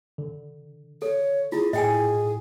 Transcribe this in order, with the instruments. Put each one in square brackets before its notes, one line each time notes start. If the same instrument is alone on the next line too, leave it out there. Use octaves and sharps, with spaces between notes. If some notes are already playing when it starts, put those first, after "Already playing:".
[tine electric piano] D3
[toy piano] A4 [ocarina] C#5
[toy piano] E4 F4 [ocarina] G#4
[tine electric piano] A2 [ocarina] G#4 [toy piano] D#5 G5 G#5